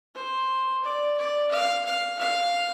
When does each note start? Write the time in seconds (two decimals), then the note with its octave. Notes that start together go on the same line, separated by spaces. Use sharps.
0.15 C5
0.84 D5
1.17 D5
1.51 F5
1.85 F5
2.19 F5